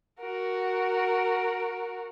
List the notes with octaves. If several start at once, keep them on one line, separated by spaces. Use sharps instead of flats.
F#4 A#4